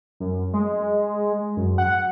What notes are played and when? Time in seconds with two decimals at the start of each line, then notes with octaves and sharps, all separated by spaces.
0.20 F#2
0.53 G#3
1.57 F#2
1.78 F#5